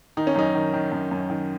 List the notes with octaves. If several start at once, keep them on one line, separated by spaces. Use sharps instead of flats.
D#3 D#4
C#4
F#2 D#4
D#3
D#3
F#2
F#2
D#3